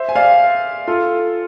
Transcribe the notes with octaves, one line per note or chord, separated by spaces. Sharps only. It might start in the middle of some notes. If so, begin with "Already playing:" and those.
Already playing: C5 E5
G#5
D5 F5
F4 A4